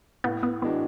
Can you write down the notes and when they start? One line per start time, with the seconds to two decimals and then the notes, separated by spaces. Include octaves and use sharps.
0.24 A2 B3
0.43 B3
0.62 E3 G#3 B3 D4 F#4